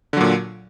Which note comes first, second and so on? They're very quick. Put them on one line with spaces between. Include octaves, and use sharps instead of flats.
D3 F#3 A#2